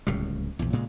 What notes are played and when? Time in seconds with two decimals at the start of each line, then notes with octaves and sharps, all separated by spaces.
0.07 D1 C#2 A2 G3
0.59 A#1 E2
0.73 A#2 C#3 G#3